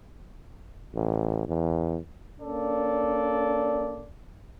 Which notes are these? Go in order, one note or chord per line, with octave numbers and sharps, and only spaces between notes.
A1
E2
A#3 C#4 D4 A4 D5